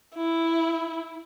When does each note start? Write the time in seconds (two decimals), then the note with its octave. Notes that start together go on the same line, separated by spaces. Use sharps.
0.16 E4